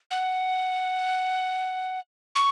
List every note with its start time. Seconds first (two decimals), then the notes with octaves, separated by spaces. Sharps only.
0.11 F#5
2.36 C#6